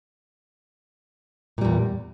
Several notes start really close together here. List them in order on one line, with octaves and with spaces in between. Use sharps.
A#2 G3 E2